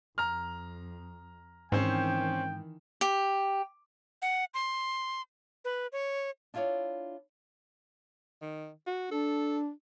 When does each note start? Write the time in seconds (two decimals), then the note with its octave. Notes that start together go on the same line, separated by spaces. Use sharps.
0.18 F2 A#5 F6
1.72 G#2 D#3 E3 C4 C#4 C5 G5
3.01 G4
4.22 F#5
4.54 C6
5.65 B4
5.92 C#5
6.54 D4 E4 F4 A#4 C#5 D5
8.42 D#3
8.87 F#4
9.11 D4 A4